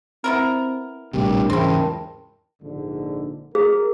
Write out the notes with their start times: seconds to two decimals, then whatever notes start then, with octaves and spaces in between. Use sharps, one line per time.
0.24 B3 C4 E4 A#4
1.13 A#1 A2 C3 G3 D4 A#4 G5
1.50 E2 G#2 C#3 C4 E4 A#4 G5 A5
2.62 A#1 G#2 D3
3.55 G#4 A#4